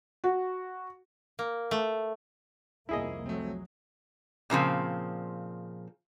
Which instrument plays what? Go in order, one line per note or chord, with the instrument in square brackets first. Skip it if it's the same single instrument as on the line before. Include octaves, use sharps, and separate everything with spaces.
[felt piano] F#4
[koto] A#3
A3
[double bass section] C2 F2 A#3 [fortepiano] E4 G#4 D#5
[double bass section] F#3 [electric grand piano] A3 C4
[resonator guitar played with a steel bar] A#2 C#3 F3 C4